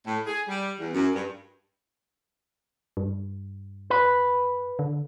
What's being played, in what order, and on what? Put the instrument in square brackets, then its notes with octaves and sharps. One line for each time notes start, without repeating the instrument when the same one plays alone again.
[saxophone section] A2
G#4
G3
E2
F#2
G2
[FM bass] G2
[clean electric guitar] B4
[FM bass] D3